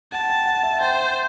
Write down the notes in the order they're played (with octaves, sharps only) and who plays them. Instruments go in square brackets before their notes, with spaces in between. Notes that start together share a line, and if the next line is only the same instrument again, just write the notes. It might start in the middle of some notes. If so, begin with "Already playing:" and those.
[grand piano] F#5 [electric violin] A5
[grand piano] G5
F#5
E5
[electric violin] C5 [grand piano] G5